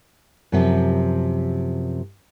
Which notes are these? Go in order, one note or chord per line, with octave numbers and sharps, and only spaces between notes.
F#2 C3 F3